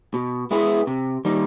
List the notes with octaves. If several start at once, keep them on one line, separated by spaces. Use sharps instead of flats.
B2
G#3 B3 E4 G#4
C3
D#3 G3 A#3 D#4